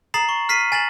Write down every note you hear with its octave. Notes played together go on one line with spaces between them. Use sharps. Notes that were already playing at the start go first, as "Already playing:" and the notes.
A#5 D#6 A6 C7 E7 F#7
C#6
F6 B6 C7 D#7
G#5 A6 E7 F#7